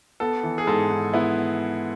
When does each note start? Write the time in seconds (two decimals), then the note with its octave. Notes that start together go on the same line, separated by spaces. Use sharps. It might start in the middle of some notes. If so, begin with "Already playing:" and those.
0.20 B3 A4
0.43 E3
0.58 G#4
0.67 G#2 A4
0.90 G#2
1.14 B3 E4